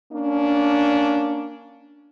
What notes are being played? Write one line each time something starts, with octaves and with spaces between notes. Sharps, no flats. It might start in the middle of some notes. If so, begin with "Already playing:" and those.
A#3 C#4 D4